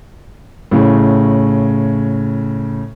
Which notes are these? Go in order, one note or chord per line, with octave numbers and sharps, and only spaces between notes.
A2 C#3